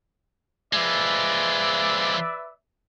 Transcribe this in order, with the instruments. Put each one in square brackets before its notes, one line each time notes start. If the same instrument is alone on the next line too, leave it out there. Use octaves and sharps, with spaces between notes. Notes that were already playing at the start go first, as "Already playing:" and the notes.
[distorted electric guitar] F3 G#3 [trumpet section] B4 D5 E5